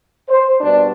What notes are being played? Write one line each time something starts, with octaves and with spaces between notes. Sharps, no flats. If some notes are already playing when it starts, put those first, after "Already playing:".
C5
B2 G3 D4